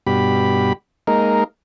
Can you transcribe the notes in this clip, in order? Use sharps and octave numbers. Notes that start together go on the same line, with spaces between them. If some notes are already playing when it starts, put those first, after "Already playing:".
G2 B2 G4 B5
G#3 A#3 D#4 A#4